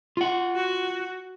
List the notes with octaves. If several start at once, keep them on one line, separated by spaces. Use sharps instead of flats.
F4 F#5
F#4